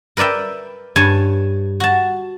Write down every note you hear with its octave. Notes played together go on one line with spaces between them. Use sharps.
A#4 B4 D5 E5 G5
G2 C#5 G#5 A5
F#4 A5